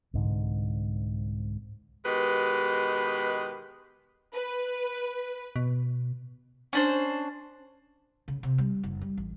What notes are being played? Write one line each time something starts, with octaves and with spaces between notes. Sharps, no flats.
C2 G#2 D3
B2 D#3 G#3 G4 B4
B4
B2
C#4 D4 C5
C#3
C3
G3
F#1
G3
A1